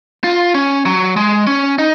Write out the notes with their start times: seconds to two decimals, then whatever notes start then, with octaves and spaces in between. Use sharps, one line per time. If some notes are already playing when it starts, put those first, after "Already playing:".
0.24 F4
0.55 C#4
0.85 F#3
1.16 G#3
1.47 C#4
1.79 D#4